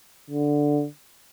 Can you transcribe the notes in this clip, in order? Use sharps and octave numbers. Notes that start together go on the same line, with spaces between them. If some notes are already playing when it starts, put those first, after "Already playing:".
D3